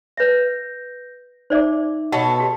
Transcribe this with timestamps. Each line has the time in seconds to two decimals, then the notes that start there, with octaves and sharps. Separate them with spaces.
0.17 B4 E5 G6 A#6
1.50 D#4 C5 D5 E5 D6
2.12 B2 A4 C#5 F#5
2.40 F#4 G4